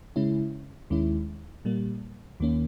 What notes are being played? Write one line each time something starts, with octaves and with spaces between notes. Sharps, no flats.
C#3 G#3 C#4 E4
D#2 D#3 G#3 C#4 E4
A#2 G3 A#3
D#2 D#3 A#3 C#4